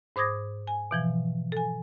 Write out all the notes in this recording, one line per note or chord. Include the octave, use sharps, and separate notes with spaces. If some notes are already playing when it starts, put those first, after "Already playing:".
G#2 C5 D6 D#6 G#6 A#6
G#5
B2 E3 F3
A4 G#5